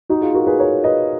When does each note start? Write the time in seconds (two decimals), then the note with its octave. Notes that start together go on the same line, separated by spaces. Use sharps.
0.09 D#4 F#4
0.22 F4 G#4
0.34 F#4 A#4
0.47 G#4 B4
0.59 A#4 C#5
0.84 B4 D#5